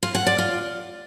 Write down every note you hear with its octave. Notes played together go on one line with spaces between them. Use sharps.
F4
F#5
D5
F4